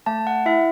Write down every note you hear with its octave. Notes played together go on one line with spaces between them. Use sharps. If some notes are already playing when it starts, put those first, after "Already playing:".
A3 A5
F#5
E4 E5